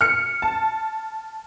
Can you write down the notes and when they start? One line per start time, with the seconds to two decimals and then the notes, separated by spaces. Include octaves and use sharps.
0.01 F6 C#7
0.42 A5